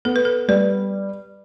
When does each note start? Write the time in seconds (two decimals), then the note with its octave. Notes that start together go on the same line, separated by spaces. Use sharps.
0.05 B3 A4
0.16 B4
0.25 A4
0.48 G3 B4